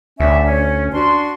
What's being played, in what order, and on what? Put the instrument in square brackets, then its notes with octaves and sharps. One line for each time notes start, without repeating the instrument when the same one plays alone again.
[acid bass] D2 [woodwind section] C#4 D5 E5
[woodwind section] C#4
D4 F#4 C6